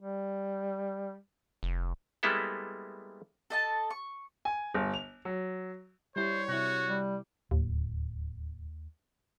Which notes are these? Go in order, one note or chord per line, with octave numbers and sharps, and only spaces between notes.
G3
F1
G3 G#3 A#3 B3 E4 A4
A4 D#5 A5
C#6
G#5
G1
F7
F#3
G3 E4 C5 C#5
C3 E4 F#4
G3
D1 D#2